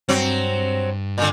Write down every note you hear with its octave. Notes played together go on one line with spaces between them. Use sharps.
G2 F#3 C4
A#2 D3